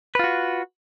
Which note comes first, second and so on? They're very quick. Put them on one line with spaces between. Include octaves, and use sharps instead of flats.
B4 F4 F#4